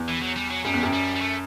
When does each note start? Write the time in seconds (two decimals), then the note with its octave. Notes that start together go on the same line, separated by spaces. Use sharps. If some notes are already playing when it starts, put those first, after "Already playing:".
Already playing: E2
0.08 E3
0.22 F#3
0.36 G3
0.51 F#3
0.65 F#2 G3
0.74 E2
0.83 F#2
0.93 G3
1.15 G3
1.21 A3